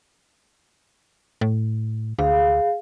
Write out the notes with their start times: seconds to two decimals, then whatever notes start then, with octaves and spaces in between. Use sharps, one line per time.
1.41 A2
2.19 D2 G#4 F5